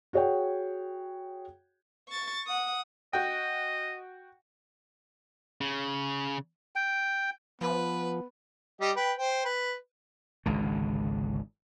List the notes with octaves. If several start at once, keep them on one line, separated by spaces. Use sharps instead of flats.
F#4 G#4 C#5 F#5 G5
C#6 A6
F#5 D#6
F#4 D#5 G5
C#3
G5
F3 B3 B4
G3 G4 D#5
B4 G5
C5 G5
B4
G#1 C#2 D3